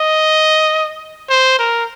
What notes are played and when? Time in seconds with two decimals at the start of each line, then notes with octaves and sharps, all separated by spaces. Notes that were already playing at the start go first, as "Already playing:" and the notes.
Already playing: D#5
1.30 C5
1.59 A#4